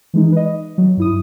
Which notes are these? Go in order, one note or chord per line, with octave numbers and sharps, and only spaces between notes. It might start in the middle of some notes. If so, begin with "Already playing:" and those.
E3 G#3 D#4
B4 D#5
F#3
G2 E4 D#6